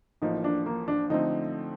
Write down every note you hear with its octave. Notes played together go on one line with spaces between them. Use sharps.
A1 A2 F3 A#3 D#4
D4
A#3
D4
D3 F3 A3 C4 D#4